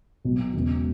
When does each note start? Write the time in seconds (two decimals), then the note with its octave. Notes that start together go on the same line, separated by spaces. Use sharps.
0.25 B1 B2 F#3
0.53 E1 E2 C#3 E3 G#3